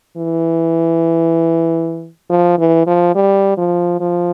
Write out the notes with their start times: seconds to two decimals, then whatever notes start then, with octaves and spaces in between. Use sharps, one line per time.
0.17 E3
2.30 F3
2.58 E3
2.87 F3
3.15 G3
3.58 F3
4.00 F3